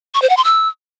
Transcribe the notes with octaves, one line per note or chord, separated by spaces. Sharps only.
C#6
C5
F#5
C6
E6